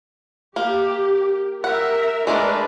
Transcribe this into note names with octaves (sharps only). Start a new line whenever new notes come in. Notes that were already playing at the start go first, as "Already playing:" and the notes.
A#3 G4
G4 A#4 E5 F#5
G#3 A3 D4 A#4 B4